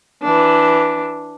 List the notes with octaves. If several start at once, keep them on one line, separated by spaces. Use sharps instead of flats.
E3 D4